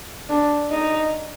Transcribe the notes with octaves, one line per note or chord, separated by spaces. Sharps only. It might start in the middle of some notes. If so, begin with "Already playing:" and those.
D4
D#4